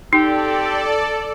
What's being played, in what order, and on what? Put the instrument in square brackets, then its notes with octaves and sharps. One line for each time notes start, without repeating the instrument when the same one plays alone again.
[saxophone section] C4 G4 [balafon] D#4 [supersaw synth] A4 D5